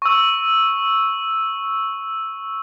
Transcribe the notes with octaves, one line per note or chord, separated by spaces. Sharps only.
C#6 E6